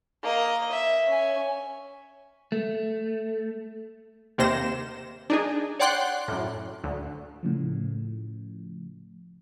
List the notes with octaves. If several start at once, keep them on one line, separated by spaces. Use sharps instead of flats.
A#3 D#5
E5
C#4 G#5
A3
D#2 C3 A#3 C5 A#6 E7
D4 D#4 G#4
C#5 D5 F#5 G5 C6 F#6
F#2 A2
D2
A2 C#3 F3